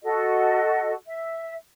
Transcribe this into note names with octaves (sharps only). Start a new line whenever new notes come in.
F#4 A4 D#5
E5